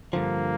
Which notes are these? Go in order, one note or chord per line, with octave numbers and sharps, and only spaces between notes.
G2 D3 F3 A#3